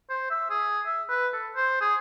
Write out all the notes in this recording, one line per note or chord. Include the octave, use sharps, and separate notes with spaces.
C5
E5
G#4
E5
B4
A4
C5
G#4